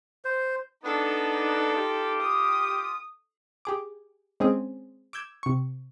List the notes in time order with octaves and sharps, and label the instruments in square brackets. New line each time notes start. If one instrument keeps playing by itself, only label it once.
[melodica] C5
[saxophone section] B3 D4 [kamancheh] D#4 A4
[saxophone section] F4 G4
[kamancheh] D#6
[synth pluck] G4 G#4 D6
G#3 C4 C#4 G#4
D6 E6 G6 G#6 E7
C3 C#6